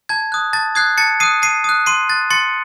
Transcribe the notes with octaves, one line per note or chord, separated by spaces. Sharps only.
A5 G#6
D#6 F#6
A5 A6
D#6 F#6 G#6 C7
A5 A6 C#7
D#6 F#6 C7 D#7
A5 C7 D#7
D#6 F#6
C6 C7 D#7
F#6 A6
C6 A6 C#7